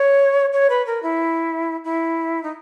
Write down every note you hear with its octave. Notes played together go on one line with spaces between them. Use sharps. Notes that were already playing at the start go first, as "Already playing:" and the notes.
Already playing: C#5
C#5
B4
A#4
E4
E4
D#4